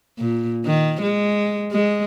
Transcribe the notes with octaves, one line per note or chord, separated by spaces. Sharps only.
A#2
D#3
G#3
G#3